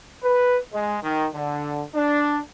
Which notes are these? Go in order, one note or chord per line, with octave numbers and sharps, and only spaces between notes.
B4
G#3
D#3
D3
D4